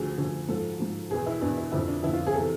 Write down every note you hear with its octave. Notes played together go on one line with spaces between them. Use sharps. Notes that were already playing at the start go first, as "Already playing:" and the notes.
Already playing: D2 D3 F3 G#4
D2 D3 F3
G#2 F3 A4
G#2 F3
E2 B2 G#4
E4
E2 B2 D4
E4
F2 D3 F3 E4
D4
F2 D3 F3 E4
F4
G#4
C3 E3 A4